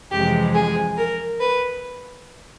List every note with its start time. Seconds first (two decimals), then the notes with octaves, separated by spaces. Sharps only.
0.11 F2 C3 E3 G#3 G4
0.55 G#4
0.97 A#4
1.40 B4